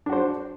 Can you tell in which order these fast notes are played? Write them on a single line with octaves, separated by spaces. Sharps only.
D4 F#4 C5